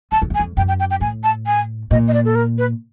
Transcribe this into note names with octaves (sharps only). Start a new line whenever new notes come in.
F#2 A5
F2
E2
G#5
F2
F#2 G5
G5
G5
G5
A2 G#5
A5
G#5
A#2 D#5
D#5
D5
A4
A#4
B4